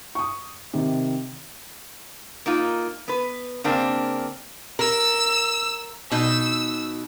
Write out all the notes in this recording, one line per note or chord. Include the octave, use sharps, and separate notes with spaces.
C#6 D#6
C3 D#3
A#3 D#4 F4
B3 B4
C#3 A#3 C4 D4
A#4 E6
B2 D#4 E6